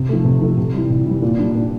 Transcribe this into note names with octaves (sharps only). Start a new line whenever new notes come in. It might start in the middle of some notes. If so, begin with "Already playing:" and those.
Already playing: C3
F3 A3
C3
F3 A3
C3
E3 G3
C3
E3 G3
A#2
G3 D4
A#2